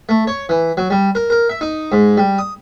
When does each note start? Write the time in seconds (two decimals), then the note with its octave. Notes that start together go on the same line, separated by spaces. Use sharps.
0.09 A3
0.27 C#5
0.49 E3
0.77 F#3
0.90 G3
1.15 A#4
1.30 A#4
1.49 E5
1.61 D#4
1.92 G#2
2.17 G3
2.38 D#6